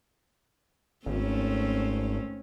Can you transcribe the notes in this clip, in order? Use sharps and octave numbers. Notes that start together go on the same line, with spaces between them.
G#1 A3 C4 C#4